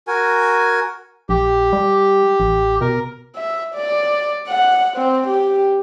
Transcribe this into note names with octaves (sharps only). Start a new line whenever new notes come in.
F#4 A#4 G#5
A#1 G4
G3
A1
B2 A#4
E5
D5
F#5
C4
G4